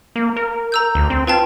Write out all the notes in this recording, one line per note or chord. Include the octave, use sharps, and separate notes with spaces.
A#3
A#4
A#5 E6 G6
D2
C4
F4 B4 G5 A5